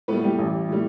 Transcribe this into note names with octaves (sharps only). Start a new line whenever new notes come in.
A2 G3 B3 B4
G3 G4
A1
A2 G3